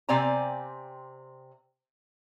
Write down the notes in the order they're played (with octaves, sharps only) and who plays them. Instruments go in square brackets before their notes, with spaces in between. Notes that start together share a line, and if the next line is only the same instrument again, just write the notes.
[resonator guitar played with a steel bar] C3 C4 D5 G#5 A#5